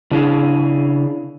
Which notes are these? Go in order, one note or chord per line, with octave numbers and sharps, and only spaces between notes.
C#3 D4 E4 G#4 F5